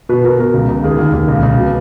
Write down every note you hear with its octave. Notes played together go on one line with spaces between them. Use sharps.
B2 B4
B2 A#4
B2 A#4
C#2
C#2
D#2 G#4
D#2
D#2
C#2
C#2
B2